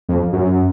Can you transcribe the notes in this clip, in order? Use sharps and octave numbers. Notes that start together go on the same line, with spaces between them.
F2
F#2